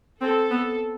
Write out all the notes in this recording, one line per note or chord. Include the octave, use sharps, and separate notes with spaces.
C4 A4
B3